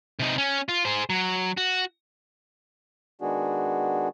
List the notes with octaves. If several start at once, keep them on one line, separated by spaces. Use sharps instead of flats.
C3 D#4
C#4
F4
G#4 C5
F#3
F#4
D#3 G#3 B3 D4 F#4 G#4